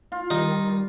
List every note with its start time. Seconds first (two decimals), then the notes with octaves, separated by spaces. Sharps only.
0.12 F4
0.31 D#3 G3 D#4